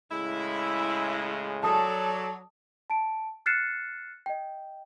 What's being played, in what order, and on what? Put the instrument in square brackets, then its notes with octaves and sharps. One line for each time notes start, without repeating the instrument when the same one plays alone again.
[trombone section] A2 C#3 G#3 [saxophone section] E4
[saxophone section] F#3 [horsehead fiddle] A4 D5 [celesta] A5 D#6
[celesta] A5 D7
F6 F#6 A6 C7 C#7 E7
D#5 G5